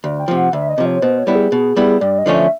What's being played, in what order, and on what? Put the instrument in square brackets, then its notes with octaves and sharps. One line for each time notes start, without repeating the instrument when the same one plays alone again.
[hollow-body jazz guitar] D2
[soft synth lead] G5
[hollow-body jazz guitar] C3 F3
[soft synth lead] F#5
[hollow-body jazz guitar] D2 [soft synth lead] E5
[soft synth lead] D#5
[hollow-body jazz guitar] C3 F3
[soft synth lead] C#5
[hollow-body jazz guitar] B2 [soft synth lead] C5
[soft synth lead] C#5
[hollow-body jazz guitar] G3 B3 E4
[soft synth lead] G#4
[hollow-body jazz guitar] B2
G3 B3 E4
[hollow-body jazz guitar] G2 [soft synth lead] D5
[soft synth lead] D#5
[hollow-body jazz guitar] D3 F3 A3 C#4
[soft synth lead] E5